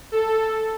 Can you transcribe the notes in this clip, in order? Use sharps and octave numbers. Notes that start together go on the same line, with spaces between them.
A4